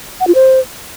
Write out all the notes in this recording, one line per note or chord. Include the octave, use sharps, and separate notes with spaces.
F#5
F4
C5